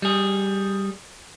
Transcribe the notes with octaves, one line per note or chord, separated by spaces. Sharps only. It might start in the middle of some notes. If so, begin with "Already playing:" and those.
G3 G#4